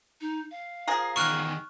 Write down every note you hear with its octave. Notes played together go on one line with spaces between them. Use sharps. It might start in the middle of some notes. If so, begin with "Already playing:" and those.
D#4
F5
F3 G#4 A#4
E2 D#3 C#6 F6 F#6